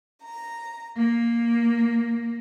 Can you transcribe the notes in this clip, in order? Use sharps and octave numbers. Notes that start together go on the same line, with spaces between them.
A#5
A#3